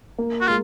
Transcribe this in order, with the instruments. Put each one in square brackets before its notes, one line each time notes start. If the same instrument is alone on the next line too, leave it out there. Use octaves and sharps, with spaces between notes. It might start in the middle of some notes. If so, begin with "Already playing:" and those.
[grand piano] A#3
[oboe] F#4
[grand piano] G#3 [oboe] F4